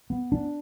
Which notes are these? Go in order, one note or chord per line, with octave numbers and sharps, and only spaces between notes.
B3
D4